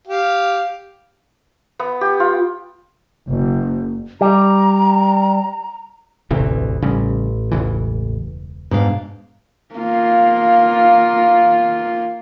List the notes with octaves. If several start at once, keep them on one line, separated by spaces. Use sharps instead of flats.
G4 F5
B3
G4
F4
F#1
G3 A#5
E1 A1 D2 C3 E3
A1 C#3 G3
E1 C#2 E3
G#2 B2 D4 F5
A#3 F4